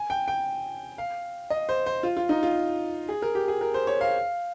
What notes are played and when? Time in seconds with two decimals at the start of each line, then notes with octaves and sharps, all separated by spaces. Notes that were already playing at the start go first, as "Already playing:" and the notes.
Already playing: G#5
0.10 G5
0.28 G5
0.98 F5
1.50 D#5
1.69 C5
1.86 C5
2.03 F4
2.17 F4
2.29 D#4
2.43 F4
3.09 G#4
3.22 A#4
3.35 G4
3.48 G#4
3.61 A#4
3.74 C5
3.87 C#5
4.01 F5